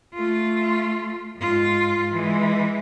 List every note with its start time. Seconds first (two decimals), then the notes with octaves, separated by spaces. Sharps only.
0.15 A3 F4
1.37 G#2 F4
2.11 E3 G#3